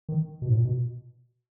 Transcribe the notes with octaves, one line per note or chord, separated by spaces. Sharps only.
D#3
B2
G#2
A#2
B2